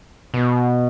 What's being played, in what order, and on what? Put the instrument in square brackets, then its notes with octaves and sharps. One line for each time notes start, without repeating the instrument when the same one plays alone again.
[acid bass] B2